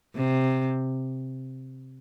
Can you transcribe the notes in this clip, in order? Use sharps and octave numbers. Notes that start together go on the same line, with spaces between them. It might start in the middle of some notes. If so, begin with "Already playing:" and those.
C3